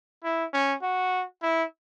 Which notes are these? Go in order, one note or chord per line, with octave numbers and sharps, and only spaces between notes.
E4
C#4
F#4
E4